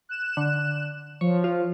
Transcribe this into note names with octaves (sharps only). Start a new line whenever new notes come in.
F#6 E7
D3
F3 C#5
F4